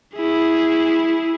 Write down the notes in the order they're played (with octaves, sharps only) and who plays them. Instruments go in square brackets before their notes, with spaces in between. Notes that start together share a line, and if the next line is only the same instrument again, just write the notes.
[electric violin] E4 G#4